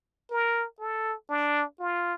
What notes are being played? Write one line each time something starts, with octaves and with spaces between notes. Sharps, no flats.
A#4
A4
D4
F4